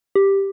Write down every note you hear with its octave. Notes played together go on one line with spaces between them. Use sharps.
G4